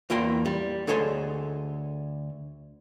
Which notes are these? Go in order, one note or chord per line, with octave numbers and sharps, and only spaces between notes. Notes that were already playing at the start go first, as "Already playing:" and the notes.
E2 A#3 E4 G5 C6
G3
D2 G#4 A4 C#5 D#5 C6